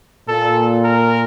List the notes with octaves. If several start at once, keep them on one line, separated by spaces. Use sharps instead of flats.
A#2 A4
A#4